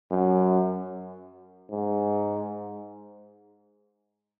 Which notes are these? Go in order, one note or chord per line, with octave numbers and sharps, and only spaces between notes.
F#2
G#2